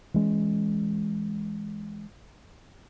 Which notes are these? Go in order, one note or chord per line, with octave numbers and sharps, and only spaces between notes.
E3 G#3 C#4